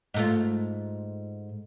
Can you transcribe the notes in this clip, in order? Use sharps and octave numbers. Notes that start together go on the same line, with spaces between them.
G#2 A3 F4